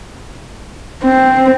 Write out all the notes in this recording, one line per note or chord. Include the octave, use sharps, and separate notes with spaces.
C4